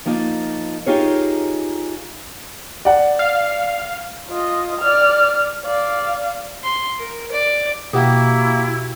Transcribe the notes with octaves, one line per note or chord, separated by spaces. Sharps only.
F3 A#3 D#4 F4
D#4 F4 G4 G#4 A#4 C#5
D5 F#5
F5
F4 D#5
D5 F6
D5 F5
C6
A#4
D5
B2 A#3 E4 F#4 G4